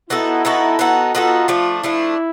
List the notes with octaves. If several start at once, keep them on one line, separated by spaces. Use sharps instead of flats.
B3 D#4 E4 F#4 A4
B3 D#4 F#4 A4
B3 D#4 F#4 A4
B3 D#4 F4 F#4 A4
F3 A3 D4
F3 A3 D4 E4